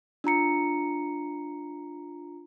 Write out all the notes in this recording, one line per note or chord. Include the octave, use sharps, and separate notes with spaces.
D4 F4 A#5 C#7